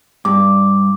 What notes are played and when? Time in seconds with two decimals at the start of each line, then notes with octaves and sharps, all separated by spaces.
0.25 G2 D6